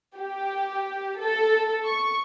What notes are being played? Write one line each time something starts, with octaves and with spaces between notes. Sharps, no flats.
G4
A4
C#6